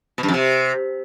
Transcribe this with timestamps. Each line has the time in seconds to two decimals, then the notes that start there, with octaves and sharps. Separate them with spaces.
0.18 B2
0.23 G2
0.28 F2
0.34 C3